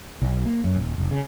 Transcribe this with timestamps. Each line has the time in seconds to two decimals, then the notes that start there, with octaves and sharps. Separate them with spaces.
0.22 B1
0.45 A#3
0.64 F#2
0.76 D#1
0.98 F1
1.11 C#3